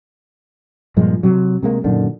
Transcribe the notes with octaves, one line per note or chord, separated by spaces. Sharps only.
G2 A#2 F3 G#3
C3 F#3
C3 G#3 A#3
F#2 A#2 D3 D#3